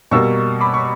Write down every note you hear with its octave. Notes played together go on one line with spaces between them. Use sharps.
B2 G3 A#3 C#6 E6
B5 D6
C#6